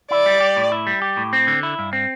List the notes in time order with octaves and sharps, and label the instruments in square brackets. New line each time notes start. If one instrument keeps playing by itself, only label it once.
[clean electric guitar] E4 [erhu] D5
[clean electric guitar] G3
G4
A2
E4
G3
G4
A2
C4
D3
E4
G2
C4